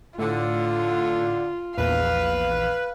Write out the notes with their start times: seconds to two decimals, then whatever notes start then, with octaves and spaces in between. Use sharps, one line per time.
0.18 A2 D3 F4
1.78 A#1 E2 B4 F5